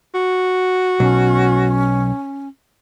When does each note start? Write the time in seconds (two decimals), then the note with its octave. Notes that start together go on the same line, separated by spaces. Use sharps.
0.14 F#4
1.00 B1 C#4